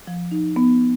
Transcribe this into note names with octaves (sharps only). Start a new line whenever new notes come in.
F3
D#4
B3